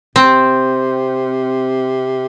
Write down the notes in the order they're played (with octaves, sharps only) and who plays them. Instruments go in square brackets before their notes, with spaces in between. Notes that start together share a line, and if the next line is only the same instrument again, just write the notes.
[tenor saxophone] C3 [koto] C4